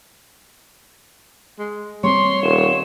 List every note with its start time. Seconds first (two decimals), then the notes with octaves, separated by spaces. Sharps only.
1.59 G#3
2.04 G3 A3 C4 C#5 C6
2.43 D#1 E7